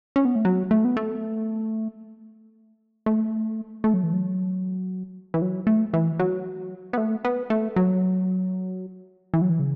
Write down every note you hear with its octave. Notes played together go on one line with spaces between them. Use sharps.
C#4
B3
A3
F#3
A3
B3
A3
A3
A3
F#3
E3
F#3
E3
F#3
A3
E3
F#3
B3
A3
B3
A3
F#3
E3
F#3
E3
C#3